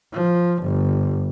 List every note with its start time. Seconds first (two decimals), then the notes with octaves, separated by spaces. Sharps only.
0.13 F3
0.63 G1